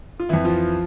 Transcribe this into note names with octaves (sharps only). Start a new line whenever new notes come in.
F4
F2 E3 E4
F3 F4